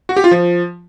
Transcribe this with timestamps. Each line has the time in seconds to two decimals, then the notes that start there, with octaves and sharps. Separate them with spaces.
0.09 F#4
0.17 G4
0.24 F4
0.31 F3